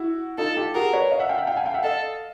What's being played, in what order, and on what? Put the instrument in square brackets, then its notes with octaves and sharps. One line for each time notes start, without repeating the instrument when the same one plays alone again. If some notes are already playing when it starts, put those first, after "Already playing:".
Already playing: [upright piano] E4 F#4
[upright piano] D#4 F4 [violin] A4
[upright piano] F4 G4
[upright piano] F#4 G#4 [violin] A#4
[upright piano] B4 C#5
D#5 F5
E5 F#5
F5 G5
E5 F#5
F5 G5
F#5 G#5
F5 G5
E5 F#5
[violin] A4 [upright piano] D#5 F5